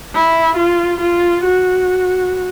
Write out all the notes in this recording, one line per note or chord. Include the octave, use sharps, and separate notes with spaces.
E4
F4
F4
F#4